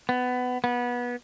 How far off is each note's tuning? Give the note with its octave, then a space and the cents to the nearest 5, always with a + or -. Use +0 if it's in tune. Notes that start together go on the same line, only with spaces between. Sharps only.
B3 +20
B3 -20